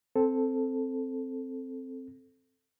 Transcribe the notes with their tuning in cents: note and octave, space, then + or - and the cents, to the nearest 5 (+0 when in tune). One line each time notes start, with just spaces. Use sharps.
C4 +0 A4 +0